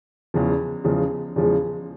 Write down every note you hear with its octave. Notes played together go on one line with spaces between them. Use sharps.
E2 C#3 F3 G#3
E2 C#3 F3 G#3
E2 C#3 F3 G#3